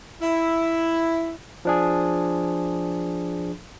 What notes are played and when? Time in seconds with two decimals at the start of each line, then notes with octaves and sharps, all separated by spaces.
0.22 E4
1.65 F3 D4 G#4